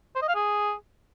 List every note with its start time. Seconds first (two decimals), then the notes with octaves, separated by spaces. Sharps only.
0.15 C5
0.22 D#5
0.28 F5
0.35 G#4